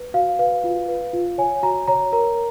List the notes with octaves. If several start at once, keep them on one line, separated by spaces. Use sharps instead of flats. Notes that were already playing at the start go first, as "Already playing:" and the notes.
Already playing: B4
F#4 F5
B4 F5
F4
B4
F4
C#5 G#5
F#4 A#5
C#5 A#5
A#4 A#5